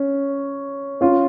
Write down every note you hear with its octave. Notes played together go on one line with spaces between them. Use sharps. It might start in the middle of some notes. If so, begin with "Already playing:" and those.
Already playing: C#4
C#4 F4